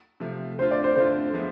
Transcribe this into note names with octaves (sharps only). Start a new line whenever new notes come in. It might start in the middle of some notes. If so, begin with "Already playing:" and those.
C3 F3 A3
D3 A3 C4 F4 C5
D5
C5
D3 A3 C4 F4 C5
F3 G#3 B3 E4